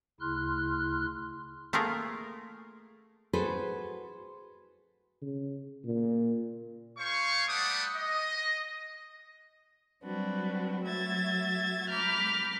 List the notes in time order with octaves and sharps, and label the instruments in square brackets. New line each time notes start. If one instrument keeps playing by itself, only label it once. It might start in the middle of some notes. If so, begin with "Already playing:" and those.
[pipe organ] D2 C#3 E4 C6 F6 F#6
[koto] A3 A#3 F4 G#4 A#4
[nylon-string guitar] F#4 G#4 A4 B4 C5
[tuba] C#3
A#2
[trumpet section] C5 F5 G#5 C#6
G3 A3 D5 F#5 D6 D#6
D#5
[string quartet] F#3 G3 C4 D4 F#4 B4
F#3 A3 F#4 E5 G#6 A6
A#5 B5 D6 F6 G6